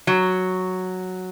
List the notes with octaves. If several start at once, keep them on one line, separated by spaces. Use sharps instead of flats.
F#3